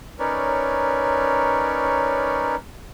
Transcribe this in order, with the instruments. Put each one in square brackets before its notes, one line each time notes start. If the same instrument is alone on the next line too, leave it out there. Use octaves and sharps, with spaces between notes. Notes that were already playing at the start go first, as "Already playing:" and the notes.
[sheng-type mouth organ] C#4 D#4 A#4 B4 C#5 D5